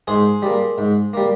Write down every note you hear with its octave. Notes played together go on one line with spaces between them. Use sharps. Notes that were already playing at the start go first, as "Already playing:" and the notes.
G#2 G#4 C5
G3 A#3
G#2
G3 A#3